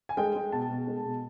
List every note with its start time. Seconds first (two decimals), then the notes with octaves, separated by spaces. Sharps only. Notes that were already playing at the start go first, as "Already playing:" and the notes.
0.09 G#5
0.17 G#3 G5
0.35 G#3
0.52 B2 A5
0.70 B2
0.87 G#3
1.06 B2